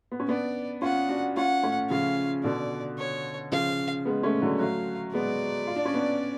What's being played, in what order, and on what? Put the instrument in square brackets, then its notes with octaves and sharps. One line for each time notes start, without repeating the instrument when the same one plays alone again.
[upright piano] B3
C#4
[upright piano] B3 D4 [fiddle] D5
[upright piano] C#4 F4 [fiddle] F#5
[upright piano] D4 F#4
[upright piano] C#4 F4 [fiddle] F#5
[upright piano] A3 C#4
[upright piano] C#3 F3 [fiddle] F5
[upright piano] B2 D3 [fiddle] D5
[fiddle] C#5
[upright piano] C#3 F3 [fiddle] F5
[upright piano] G#3 B3
A3 C#4
D3 F#3
[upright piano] F#3 A3 [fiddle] F5
[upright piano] G#3 B3 [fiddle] D5
[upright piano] F4
D4
C#4
B3 D4